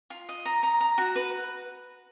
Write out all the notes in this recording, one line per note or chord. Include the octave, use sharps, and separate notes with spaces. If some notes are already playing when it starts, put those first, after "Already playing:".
F4
D#5
A#5
A#5
A#5
F#4
B4